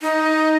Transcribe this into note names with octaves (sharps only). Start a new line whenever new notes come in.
D#4